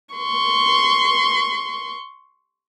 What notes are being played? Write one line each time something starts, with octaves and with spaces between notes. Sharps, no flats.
C6 C#6